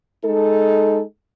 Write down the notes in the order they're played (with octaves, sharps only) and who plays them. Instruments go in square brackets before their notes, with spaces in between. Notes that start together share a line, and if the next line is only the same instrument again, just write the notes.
[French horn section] G#3 D#4 A4